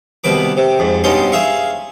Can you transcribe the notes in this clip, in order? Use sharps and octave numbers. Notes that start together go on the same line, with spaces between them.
C2 B2 D#3 B4 D6
C3
F2 G#2
G2 B2 C#4 D#4 C6
G#4 E5 F5 C#6